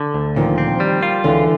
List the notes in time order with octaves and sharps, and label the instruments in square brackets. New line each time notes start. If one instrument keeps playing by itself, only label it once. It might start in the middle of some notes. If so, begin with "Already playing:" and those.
Already playing: [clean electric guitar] D3
D2
[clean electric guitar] A#2 [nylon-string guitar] D#3 F3
[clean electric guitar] C4
G3
F4
[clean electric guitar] C#2 [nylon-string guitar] D3 E3